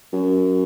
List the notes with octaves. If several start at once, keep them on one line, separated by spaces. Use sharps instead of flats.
F#2